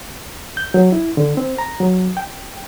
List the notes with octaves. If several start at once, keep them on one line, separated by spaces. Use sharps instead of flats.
G6
F#3
E4
D3
C4
A#5
F#3
G5